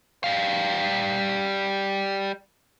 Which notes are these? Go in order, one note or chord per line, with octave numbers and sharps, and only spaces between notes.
G3 F5